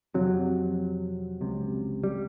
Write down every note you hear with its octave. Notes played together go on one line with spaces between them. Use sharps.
F2 C3 F#3
C#2 C3
G3